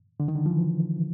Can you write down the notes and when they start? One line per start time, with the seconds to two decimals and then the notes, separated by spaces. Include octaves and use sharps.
0.20 D3
0.28 D#3
0.35 D3
0.46 F3
0.51 E3